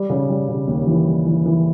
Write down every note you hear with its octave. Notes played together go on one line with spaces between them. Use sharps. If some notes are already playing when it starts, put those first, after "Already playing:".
Already playing: G3
C#3
G3
C#3
D#2
E3
G3
E3
E3